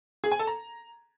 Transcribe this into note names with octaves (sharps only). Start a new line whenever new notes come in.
G#4
G#5
A4
A#5